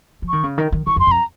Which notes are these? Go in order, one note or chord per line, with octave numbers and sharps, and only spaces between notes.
F3
D#3 C#6
C#3
D#3
D#3
D#3 C#6
F2
C6
F2
A#5